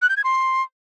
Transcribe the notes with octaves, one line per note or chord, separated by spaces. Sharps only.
F#6
G6
G#6
C6